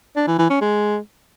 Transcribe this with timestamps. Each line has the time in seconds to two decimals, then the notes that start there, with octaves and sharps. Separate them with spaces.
0.16 D4
0.27 E3
0.39 E3
0.50 C#4
0.61 G#3